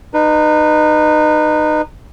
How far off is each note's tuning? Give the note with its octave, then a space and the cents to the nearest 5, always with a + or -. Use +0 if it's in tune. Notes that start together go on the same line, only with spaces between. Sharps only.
D#4 -30 B4 -10